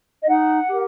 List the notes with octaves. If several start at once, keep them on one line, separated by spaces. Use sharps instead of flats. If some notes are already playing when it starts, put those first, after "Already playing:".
D#5
D#4 F#5
G4 A#4